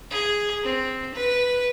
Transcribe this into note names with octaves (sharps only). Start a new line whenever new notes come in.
G#4
C4
B4